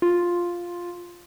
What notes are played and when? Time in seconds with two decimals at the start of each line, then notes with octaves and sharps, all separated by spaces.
0.02 F4